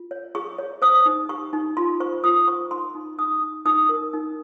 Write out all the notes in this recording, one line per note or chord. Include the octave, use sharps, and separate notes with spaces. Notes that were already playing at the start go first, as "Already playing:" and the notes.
Already playing: F4
C#5
G#4 C#6
C#5
C5 D#6
D#4
G4 C#6
D#4
F4 C6
C5 C#6
F4 D#6
C5 C#6
D#4 C6
D#4
D#4 D#6
D#4
D#4 D#6
A#4
D#4